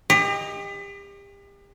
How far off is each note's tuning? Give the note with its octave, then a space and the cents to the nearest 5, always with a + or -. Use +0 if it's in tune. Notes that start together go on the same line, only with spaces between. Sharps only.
G4 +35 D#5 +0